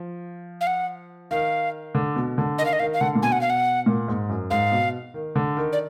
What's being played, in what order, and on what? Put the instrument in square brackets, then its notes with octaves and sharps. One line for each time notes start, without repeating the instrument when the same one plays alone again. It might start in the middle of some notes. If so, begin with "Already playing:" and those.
Already playing: [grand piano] F3
[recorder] F5
F#5
[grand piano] D#3 [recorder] F5
[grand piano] D3
B2
D3
[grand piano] D#3 [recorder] D#5
[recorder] F5
D#5
[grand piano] D#3 [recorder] F5
[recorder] F5
[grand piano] D3 [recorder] F#5
[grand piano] A#2
[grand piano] B2 [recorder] G#5
[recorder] F#5
F5
F#5
[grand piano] A#2
G#2
F#2
[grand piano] G#2 [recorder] F5
[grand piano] B2
D#3
D3
D#3
[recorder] D5